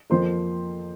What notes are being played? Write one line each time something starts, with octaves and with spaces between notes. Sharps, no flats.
F2 F3 A#3 C5 C6